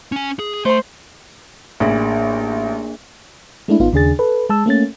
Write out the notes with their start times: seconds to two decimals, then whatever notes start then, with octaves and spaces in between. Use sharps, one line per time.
0.12 C#4 G#5
0.39 G#4
0.65 A3 C5 C6
1.80 A1 A#3 D4 G#4
3.68 G#3 A3 D4 E4
3.80 G#1 B3 D#4 F4
3.93 D#2 C#3 D4 G#4 A6
4.19 A4 B4
4.49 G#3 A5 E6
4.66 A3 A#3 C#4 A6